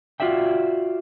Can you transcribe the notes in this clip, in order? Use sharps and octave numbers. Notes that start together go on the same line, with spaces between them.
F4 F#4 D5 E5 G5